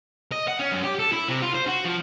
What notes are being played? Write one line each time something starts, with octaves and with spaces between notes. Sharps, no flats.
D#5
F#5
C#4
F#2
G4
A4
E4
C3
F4
C5
F#4
F3